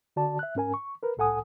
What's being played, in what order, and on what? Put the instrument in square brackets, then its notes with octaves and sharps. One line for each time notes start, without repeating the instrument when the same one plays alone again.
[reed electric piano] D3 F#4 D5 A5
E5 F#6
G#2 C#4 A#4 G#5
C#6
A#4 B4
C2 A2 A4 F#5 G#5 D#6